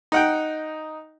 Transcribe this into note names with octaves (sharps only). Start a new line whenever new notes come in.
D#4 F#5 G5